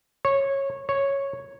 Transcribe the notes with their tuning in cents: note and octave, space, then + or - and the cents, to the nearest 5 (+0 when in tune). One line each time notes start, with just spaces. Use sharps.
C#5 -15
C#5 -5